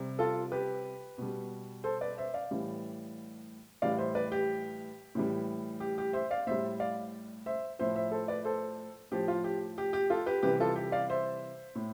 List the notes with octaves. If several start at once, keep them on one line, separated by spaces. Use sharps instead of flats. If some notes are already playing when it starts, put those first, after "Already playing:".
Already playing: C3 G3
F4 A4
G4 B4
B2 G3
A4 C5
B4 D5
C5 E5
D5 F5
A2 E3 G3
A2 E3 G3 D5 F5
C5 E5
B4 D5
G4
A2 E3 G3
G4
G4
C5 E5
D5 F5
A2 G3 C5 E5
D5 F5
C5 E5
A2 F3 C5 E5
C5 E5
A4 C5
B4 D5
A4 C5
A2 F3 G4
F4
G4
G4
G4
F4 A4
G4 B4
C3 E3 G3 G4 B4
F4 A4
G4
D5 F5
C5 E5
A2